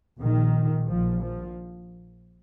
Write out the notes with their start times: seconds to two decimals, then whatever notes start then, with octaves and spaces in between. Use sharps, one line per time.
0.21 A#1 A#2 D#3
0.88 A#1 A#2 F3
1.23 F3